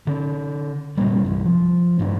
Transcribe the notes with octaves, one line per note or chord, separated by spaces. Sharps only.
D3 C#4
F1 C2 A#2 G3
C2 G2
F3
A1 G2 F#3 D4